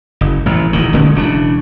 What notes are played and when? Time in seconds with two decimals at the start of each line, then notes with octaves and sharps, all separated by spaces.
0.21 F#1
0.46 A1 D#2
0.73 E1 D2 D#3
0.93 D1 D3 G#3 C#4
1.15 E1 C#3 C4 D4